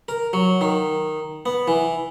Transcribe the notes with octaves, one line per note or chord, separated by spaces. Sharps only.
A#4
F#3
D#3
B3
E3